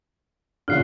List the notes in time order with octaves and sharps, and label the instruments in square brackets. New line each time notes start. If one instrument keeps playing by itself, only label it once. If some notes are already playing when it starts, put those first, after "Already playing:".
[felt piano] A1 A#2 C#3 [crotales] F6 F#6 C7